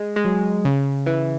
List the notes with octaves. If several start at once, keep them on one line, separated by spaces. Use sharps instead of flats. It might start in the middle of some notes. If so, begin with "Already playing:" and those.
Already playing: G#3
G#3
F#3
C#3
E3